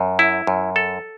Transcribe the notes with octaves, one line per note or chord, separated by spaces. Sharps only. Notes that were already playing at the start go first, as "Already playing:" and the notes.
Already playing: F#2
E4
F#2
A4